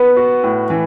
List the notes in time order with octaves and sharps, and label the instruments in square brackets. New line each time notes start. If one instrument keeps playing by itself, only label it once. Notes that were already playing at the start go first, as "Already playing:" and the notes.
Already playing: [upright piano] B3 [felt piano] B4
[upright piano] F#4
A2
E3